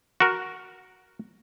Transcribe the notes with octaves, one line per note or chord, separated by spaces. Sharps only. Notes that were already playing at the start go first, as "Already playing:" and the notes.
F#4 A#4